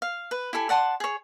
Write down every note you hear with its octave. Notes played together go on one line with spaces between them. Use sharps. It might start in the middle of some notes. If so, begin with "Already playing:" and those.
F5
B4
E4 G4 A4 G#5
D5 F#5 A5 C6
G#4 C#5